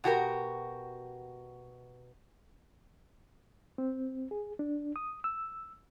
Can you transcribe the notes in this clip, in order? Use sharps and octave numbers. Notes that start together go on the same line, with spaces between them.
B2 F#4 G4 A#4
C4
G#4
D4
D#6
E6